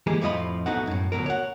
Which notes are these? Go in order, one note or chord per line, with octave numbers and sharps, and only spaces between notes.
E3 G3 G#3 A#3 G#4
F2 A2 F3 F4 D#5 B5
B1 B2 A3 D#4 F#4 F#5
F#2 A2
D2 B2 F#3 A#4
C#5 F#5